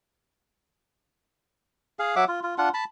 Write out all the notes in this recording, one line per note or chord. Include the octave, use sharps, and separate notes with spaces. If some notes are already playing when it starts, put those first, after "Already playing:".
G#4 F5
F#3 E5 F#5 D6
F4
F4
D4 F4 F#5
A5 B5